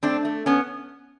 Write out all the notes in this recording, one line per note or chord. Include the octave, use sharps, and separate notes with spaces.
A3 C4 D4
A3
B3 C#4